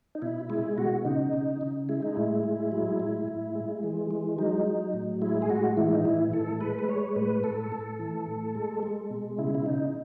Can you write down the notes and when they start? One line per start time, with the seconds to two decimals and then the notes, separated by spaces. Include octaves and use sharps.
0.15 D#4
0.22 B2 E4
0.50 G#3 E4
0.78 B2 F#4
1.05 C#3 D#4
1.33 C#3
1.61 C#3
1.89 G#3 E4
2.02 D#4
2.15 A2 E4
2.44 G#3
2.72 F#3
3.00 A2
3.28 A2
3.55 G#3
3.83 E3
4.11 G#3
4.39 F#3 D#4
4.66 F#3
4.94 A2
5.22 G#3 E4
5.42 G#4
5.50 A2 F#4
5.77 E3 E4
5.94 D#4
6.05 A2 E4
6.33 A2 A4
6.61 G#3 B4
6.79 B4
6.89 G#3 C#5
7.16 A2 B4
7.44 A2 A4
7.72 A2
7.99 E3
8.27 A2
8.55 G#3
8.83 G#3
9.10 B2
9.38 C#3 E4
9.55 E4
9.66 C#3 D#4